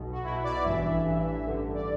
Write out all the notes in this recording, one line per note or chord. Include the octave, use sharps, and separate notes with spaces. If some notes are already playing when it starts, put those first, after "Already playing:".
Already playing: B1 B2
F#4
B1 B2 E4
D5
A1 G2 E3 E5
A1 G2 E3
A1 G2 D3
D5